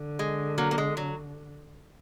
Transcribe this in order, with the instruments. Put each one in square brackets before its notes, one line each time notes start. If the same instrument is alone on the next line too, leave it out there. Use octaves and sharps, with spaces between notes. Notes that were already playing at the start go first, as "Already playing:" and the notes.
Already playing: [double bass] D3
[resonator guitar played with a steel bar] G#3
F#3 A#3
A#3
G#3
F#3